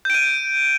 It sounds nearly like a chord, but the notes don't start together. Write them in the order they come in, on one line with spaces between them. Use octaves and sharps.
G6 D7 D#7